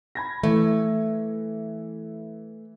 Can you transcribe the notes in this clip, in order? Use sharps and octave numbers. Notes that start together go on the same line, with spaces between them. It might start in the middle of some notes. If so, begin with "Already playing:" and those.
B5 G#6 A#6
E3 A3 E5